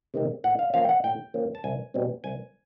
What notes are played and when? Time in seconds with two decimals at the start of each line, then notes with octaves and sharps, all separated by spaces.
0.14 C3 D#3 G#3 C4
0.44 A2 F#5
0.59 F5
0.74 F3 A#3 C#4 F5
0.84 G5
0.89 F#5
1.04 A2 G5
1.34 F3 A#3 C#4
1.55 A5
1.64 C2 G#5
1.94 B2 G3 C4
2.24 C2 G#5